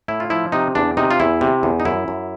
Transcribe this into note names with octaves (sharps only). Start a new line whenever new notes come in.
A2 E4
F4
F3 E4
C3 D#4
E2 D4
C3 D#4
F4
E2 E4
C3
E2
D#4
F#2 E4
F#2